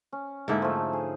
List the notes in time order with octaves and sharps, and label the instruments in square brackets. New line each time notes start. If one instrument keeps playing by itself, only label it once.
[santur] C#4
[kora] G#2 D3 E4 [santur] A#3 D#4 A5
[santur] F3 A3
G#4